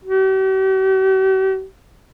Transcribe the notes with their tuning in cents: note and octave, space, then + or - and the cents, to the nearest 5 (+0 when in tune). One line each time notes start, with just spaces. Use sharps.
G4 -45